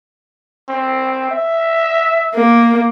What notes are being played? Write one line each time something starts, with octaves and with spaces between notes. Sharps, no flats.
C4
E5
A#3